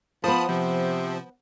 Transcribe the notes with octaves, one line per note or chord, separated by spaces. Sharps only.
F3 B3 C5 A5 B5 D#6
C3 F3